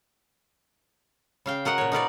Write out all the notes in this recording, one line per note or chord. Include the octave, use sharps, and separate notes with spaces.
C#3 F5 G5
F#4 A#4 D#5 F#5
A#2 C#5
D#4 A#4 B4 D5